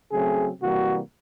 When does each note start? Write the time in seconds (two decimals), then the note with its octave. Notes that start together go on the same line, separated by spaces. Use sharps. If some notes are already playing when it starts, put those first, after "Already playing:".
0.10 C#3 F#3 A3 C4 G#4
0.60 C3 E3 G3 A#3 F#4